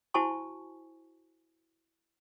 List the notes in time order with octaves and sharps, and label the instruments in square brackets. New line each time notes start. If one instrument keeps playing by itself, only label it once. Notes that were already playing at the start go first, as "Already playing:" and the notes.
[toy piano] E4 F#4 C5 G#5 A5 C#6